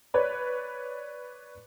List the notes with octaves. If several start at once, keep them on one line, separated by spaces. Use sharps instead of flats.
B4 C#5 D5 B5